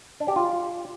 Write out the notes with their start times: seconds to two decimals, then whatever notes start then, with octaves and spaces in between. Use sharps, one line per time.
0.20 D4
0.28 G4
0.36 F4